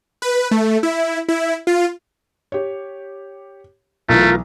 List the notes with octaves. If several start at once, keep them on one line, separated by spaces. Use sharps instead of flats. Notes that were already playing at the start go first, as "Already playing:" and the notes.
B4
A3
E4
E4
F4
G4 C#5
B1 E3 A3 F4 A#4